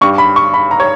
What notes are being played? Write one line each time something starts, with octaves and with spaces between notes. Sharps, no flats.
G2 G3 C#6
B5
C#6
B5
A#5
C#5